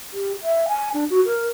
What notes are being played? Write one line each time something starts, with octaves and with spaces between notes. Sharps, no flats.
G4
E5
G#5
D4
F#4
A#4